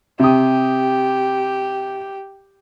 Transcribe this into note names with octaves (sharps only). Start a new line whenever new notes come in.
C3 G4 D#6